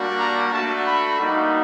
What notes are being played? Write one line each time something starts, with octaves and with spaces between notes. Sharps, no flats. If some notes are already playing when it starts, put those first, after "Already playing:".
Already playing: G3 A#3 D4 F#4
A#5
A3 D4 F#4 A5
B5
G3 A#3 D#4 F#4